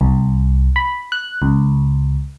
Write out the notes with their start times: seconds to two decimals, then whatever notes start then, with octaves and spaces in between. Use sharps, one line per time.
0.01 C2
0.76 B5
1.12 F#6
1.42 C#2